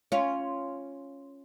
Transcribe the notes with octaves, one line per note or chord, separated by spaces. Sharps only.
C#4 F4